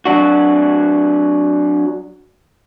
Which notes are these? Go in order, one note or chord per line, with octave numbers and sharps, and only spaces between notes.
F#3 D4 F#4